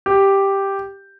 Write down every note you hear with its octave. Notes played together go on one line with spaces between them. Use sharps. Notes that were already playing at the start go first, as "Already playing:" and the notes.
G4